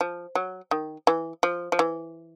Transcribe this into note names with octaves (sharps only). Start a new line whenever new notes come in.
F3
F#3
D#3
E3
F3
F3
E3